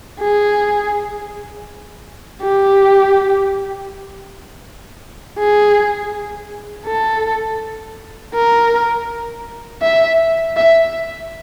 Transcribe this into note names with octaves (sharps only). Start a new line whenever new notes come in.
G#4
G4
G#4
A4
A#4
E5
E5